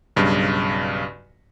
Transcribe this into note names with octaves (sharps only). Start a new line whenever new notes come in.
B1 G2 C#3